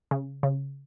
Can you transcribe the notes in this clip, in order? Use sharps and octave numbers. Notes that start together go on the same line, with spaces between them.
C#3
C#3